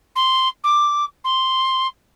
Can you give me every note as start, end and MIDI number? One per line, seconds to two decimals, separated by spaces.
0.16 0.48 84
0.64 1.05 86
1.24 1.87 84